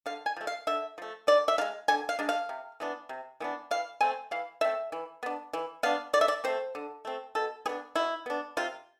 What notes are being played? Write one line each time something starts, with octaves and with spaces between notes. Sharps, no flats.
D3 F5
G#5
F3 A3
F5
D3 E5
F3 A3
D3 D5
E5
G#3 D4 F5
D3 G#5
F5
G#3 D4
F5
C3
E3 B3 D4
C3
E3 B3 D4
E3 F5
A3 C4 G#5
E3 F5
A3 C4 E5
E3
B3 D4
E3
B3 D4 F5
D3 D5
E5
D5
A3 C4 C5
D3
A3 C4
B2 A4
B3 D4 G#4
B2 E4
B3 D4
C3 F4